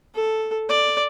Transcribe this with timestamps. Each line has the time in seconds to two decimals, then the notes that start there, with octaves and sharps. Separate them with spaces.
0.15 A4
0.69 D5